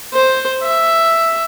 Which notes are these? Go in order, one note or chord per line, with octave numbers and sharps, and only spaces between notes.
C5
E5